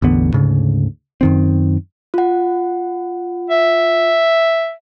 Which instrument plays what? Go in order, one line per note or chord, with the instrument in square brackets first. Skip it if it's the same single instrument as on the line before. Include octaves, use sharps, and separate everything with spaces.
[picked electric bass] A1 E2 D3 B3
D2 G#2 C#3
F#2 D#3 C4
[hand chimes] F4 F#5
[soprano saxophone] E5